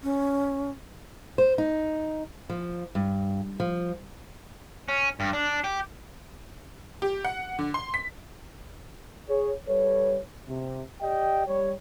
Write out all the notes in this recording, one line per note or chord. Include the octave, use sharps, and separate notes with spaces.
C#4
C5
D#4
F3
G2
F3
C#4
G2
D4
G4
G4
F#5
D3
C6
B6
G#4 C#5
G3 A4 B4 C#5
C3
G4 D5 D#5 G5
G3 C#5